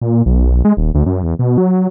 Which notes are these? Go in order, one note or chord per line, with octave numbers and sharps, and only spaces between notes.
A#2
B1
G#3
D#1
D2
F#2
E2
B2
F#3